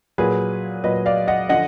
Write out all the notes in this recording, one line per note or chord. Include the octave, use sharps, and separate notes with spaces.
A#2 F#3 G#4 B4
A#2 F#3 B4 D#5
D5 F5
D#5 F#5
D3 F3 D#5 F#5